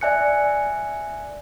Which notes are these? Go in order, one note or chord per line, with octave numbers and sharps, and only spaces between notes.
D5 E5 G#5 F#6 C#7